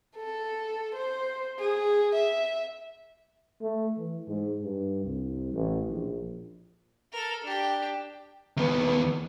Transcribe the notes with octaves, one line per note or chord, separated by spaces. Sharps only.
A4
C5
G#4
E5
A3
E3
G#2
G2
C2
A1
A#1
A4 A#4
D4 G4
D#2 B3